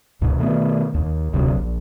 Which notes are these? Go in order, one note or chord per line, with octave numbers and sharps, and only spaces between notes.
C#2 G#2 B2
B2 D#3 A3 B3
D#2
E1 D2 C3 F#3
A#1